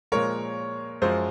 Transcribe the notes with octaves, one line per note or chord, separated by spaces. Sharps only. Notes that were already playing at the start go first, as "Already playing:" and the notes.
A#2 F3 G#3 A#4 C#5
F#2 F3 G#3 C5